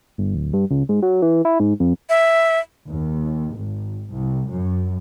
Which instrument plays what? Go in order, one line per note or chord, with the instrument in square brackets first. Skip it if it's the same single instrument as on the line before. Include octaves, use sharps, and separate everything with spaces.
[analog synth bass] G1
D1
G2
C#2
G#2
F#3
E3
E4
G#2
F2
[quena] E5
[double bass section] D#2
G#1
C2
F#2